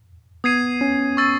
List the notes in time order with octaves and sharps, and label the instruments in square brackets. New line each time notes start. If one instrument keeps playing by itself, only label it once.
[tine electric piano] B3 [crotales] D#6 G#6 C7 D#7
[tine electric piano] C#4
[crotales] C#6 E6 A6